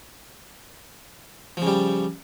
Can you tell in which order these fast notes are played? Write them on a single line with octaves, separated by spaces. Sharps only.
F3 C#3 G3